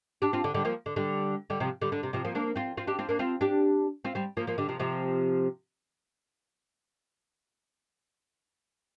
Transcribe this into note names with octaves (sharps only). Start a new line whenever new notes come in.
D4 G4
C4 F4
D3
D3 G3
F3 A#3
D3
D3 G3
D3 G3
C3 F3
D3 G3
D3
C3
C3 F3
F3 A#3
A#3 D4
C4 F4
C4 F4
D4 G4
C4 F4
A#3 D4
C4 F4
D4 G4
C4 F4
G3 C4
F3 A#3
F3 A#3
D3 G3
C3 F3
C3 F3